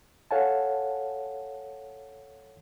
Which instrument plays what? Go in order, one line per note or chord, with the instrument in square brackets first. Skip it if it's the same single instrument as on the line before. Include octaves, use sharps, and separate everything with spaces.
[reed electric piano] A4 C#5 F5 F#5 G#5 A5